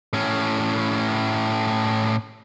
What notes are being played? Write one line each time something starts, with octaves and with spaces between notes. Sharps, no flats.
A2 C#4